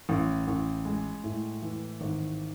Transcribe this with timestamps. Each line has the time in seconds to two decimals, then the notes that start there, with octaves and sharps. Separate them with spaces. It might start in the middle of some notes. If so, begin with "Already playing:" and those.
0.09 A1
0.47 A1
0.85 G#3
1.24 A2
1.62 E3
2.01 G#1